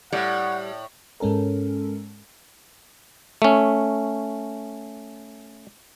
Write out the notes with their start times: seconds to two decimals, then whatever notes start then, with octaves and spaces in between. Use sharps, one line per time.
0.12 A2 G3 F#5
1.20 G#2 G#3 C#4 A4 A#4
3.42 A3 C#4